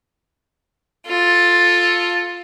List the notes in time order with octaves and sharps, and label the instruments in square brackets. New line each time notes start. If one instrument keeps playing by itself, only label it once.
[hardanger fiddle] F4 [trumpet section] A4